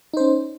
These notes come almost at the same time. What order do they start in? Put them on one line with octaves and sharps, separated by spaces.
D#4 C5 C#4